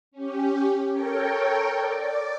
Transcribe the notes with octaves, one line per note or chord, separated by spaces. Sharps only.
C#4 G4
A4 A#4 C#5 G5
D5